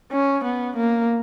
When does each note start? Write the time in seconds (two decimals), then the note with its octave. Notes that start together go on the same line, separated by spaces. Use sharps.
0.12 C#4
0.44 B3
0.76 A#3